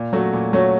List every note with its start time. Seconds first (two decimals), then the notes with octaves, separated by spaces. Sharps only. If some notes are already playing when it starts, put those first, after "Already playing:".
Already playing: A#2
0.13 F#3 A3 C#4 F#4
0.33 A#2
0.53 F#3 A3 C#4 F#4